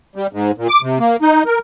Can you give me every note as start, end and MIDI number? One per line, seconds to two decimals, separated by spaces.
0.16 0.27 55
0.33 0.51 44
0.58 0.68 46
0.69 0.81 86
0.82 0.98 48
0.99 1.16 58
1.22 1.43 63
1.46 1.59 70